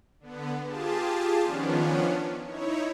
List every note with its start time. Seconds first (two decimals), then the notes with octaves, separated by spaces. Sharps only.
0.20 D3 B3
0.63 F4 G4 G#4 A5
1.42 D#3 F3 B3 C#4 D4
2.44 D#4 E4 C#5